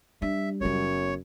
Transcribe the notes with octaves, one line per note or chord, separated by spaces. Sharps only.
G3 D4 E5
F#1 F#2 B3 C#5